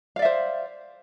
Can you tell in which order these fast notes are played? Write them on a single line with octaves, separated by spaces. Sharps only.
F5 D5 E5 C5